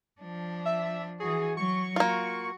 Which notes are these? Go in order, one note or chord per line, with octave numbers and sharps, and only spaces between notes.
F3 D4
E5
E3 F#4 G#4
F#3 C#6
A#3 F4 F#4